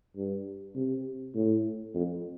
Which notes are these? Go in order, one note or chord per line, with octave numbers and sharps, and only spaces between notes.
G2
C3
A2
F2